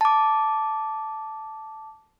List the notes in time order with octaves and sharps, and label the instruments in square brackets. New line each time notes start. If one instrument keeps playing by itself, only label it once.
[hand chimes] A5 D6